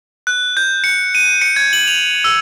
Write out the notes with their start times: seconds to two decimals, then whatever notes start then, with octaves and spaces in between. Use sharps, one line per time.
0.27 F#6
0.57 G6
0.84 C#7
1.15 D#7
1.41 C#7
1.56 G#6
1.73 F#7
1.87 F7
2.24 E6